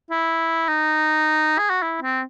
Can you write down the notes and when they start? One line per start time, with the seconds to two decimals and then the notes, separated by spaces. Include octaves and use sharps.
0.10 E4
0.68 D#4
1.58 G#4
1.70 F#4
1.82 E4
2.02 C4